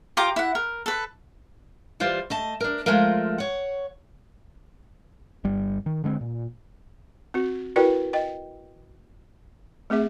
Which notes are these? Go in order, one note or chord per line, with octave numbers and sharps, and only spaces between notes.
F4 G4 A#5 D6
E4 F#5
A#4
A4 B4
E3 G3 F4 C5
A3 D#5 A5
D4 A#4
F3 G#3 A3 F4 A#4
C#5 F#5
G1 G3
D#3
D3 G#3 A3 C4
A#2
C4 F#4
E4 F#4 A#4 B4 D5 G5
D#5 G5
A3 C4 G#4 E5